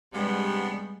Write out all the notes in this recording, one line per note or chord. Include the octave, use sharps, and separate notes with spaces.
G2 C3 G3 G#3 B3